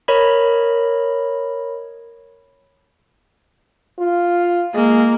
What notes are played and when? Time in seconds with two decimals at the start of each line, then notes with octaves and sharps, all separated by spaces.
0.08 A#4 C#5 D#5 B5
3.99 F4
4.74 G#3 A#3